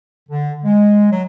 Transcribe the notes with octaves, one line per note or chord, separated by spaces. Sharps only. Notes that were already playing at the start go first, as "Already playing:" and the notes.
D3
G#3
F#3